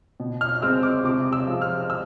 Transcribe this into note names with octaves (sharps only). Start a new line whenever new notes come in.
B2
F6
F6
G#3 C4 E6
D6
C3 D6
E6
F3 G#3 C4
F6
E6